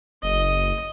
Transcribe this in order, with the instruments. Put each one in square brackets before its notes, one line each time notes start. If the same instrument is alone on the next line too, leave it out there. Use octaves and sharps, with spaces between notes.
[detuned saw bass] F#1 [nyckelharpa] D#5